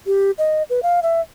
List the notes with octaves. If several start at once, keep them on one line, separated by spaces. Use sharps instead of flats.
G4
D#5
B4
F5
E5